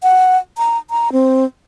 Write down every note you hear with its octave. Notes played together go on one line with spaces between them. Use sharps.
F#5
A#5
A#5
C4